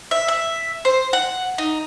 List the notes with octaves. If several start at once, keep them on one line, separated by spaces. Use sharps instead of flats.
E5
E5
C5
F#5
D#4